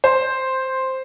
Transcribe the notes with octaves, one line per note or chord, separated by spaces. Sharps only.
C5